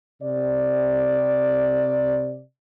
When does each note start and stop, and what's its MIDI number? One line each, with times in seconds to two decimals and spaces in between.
0.22 2.41 48
0.22 2.41 74